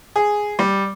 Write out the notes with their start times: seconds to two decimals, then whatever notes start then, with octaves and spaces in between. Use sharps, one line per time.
0.16 G#4
0.59 G3